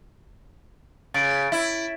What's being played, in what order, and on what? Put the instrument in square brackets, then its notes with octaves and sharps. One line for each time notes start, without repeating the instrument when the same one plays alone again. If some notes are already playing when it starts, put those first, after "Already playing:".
[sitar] C#3 [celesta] A6 D7
[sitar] E4